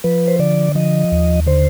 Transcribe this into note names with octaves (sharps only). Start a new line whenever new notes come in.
F3 B4
C5
D3 D5
F3 D#5
D#2
D3 C5